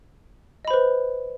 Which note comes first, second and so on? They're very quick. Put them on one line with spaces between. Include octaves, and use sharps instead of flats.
D#5 B5 C5 B4